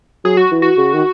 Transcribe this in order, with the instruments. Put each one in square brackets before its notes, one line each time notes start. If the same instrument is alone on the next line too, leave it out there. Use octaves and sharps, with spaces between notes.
[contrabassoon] F#3 [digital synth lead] G#4
[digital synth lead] F#4
[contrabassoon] E3
[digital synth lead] F#4
[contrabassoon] C#3
D#3